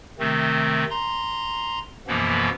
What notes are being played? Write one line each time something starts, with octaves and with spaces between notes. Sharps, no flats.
C3 D#3 A3 C4
A#5 C6
F#2 B2 E3 F3 A#3 B3